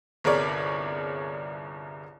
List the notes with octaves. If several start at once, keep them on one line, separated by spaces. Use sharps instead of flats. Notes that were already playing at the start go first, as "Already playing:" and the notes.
G1 C2 G#4 A#4 C#5 D5